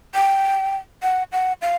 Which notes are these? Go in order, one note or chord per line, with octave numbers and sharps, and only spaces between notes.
G5
F#5
F#5
F5